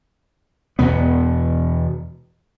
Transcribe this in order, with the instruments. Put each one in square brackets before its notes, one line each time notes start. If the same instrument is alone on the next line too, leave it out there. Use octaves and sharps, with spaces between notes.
[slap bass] E2 B2 B3